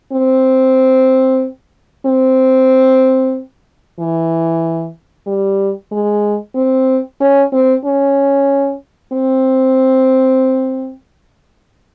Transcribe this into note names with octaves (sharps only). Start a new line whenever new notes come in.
C4
C4
E3
G3
G#3
C4
C#4
C4
C#4
C4